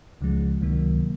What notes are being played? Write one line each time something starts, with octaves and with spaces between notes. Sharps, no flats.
C#2 C#3 F3 G#3
C#2 C3 D#3 F#3 A#3